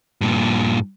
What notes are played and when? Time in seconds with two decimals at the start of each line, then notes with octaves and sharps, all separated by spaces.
0.21 G2 A#2